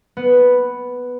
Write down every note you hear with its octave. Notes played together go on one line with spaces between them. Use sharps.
B3